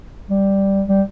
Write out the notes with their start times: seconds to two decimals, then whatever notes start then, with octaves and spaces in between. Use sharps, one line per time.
0.29 G3
0.89 G3